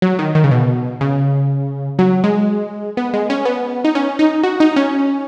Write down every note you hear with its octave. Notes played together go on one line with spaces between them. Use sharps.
F#3
D#3
D#3
C#3
B2
C#3
F#3
G#3
B3
G#3
C#4
B3
D#4
C#4
D#4
F#4
D#4
C#4